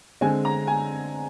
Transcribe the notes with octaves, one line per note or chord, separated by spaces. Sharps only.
D3 G#3 C4 G#5
A#5
G#5